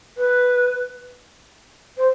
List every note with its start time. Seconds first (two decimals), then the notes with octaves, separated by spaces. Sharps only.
0.17 B4
1.97 C5